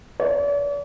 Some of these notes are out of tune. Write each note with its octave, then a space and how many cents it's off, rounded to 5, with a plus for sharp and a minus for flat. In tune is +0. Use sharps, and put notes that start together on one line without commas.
D5 -45